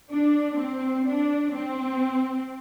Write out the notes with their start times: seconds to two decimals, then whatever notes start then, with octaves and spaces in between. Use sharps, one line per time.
0.11 D4
0.58 C4
1.06 D4
1.53 C4